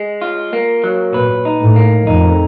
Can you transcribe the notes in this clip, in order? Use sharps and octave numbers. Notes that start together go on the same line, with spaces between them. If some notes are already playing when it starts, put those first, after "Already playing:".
Already playing: G#3
F4
A#3
F#3
A#2 B4
D#4
A2
A#3
F2 D#4